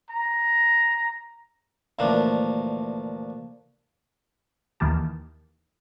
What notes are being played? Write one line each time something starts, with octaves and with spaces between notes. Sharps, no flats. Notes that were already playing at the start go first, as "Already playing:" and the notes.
A#5
D2 A#2 E3 F3 D4
D#2 D#3 E3 A#3 G4 A5